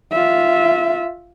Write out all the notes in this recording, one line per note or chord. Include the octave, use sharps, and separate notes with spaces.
F4 E5